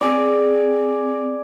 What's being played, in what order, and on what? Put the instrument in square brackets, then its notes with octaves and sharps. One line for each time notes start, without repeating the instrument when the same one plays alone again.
[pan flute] C4 [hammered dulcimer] G#4 D5